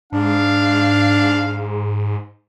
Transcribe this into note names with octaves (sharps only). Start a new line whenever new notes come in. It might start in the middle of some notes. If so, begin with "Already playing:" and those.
G#2 D4 F5